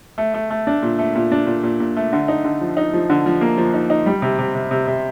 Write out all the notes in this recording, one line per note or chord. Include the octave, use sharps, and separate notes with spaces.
A3
A3
A3
D4
A#2
A3
A#2
D4
A#2
A#2
A#2
A3
D3
D#4
D3
F3
D#4
F3
D3
F3
A#3
F3
D#4
D#4
G3
C3
C3
C3
C3
C3